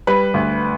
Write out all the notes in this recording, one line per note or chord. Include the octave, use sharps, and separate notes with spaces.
G3 B4
D2